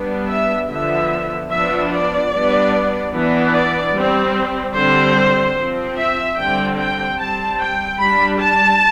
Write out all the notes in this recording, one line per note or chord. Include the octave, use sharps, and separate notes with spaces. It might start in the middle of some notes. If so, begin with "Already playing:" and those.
Already playing: G3 B3 D4
E5
D3 F3 B3 E5
F3 B3 D4 E5
D5
G3 B3 D4
E3 B3 D4
D5
G3 C4
D3 G3 C4 C5
F3 C4
E5
D3 G3 C4 G5
G5
G3 C4 A5
G5
G3 D4 B5
A5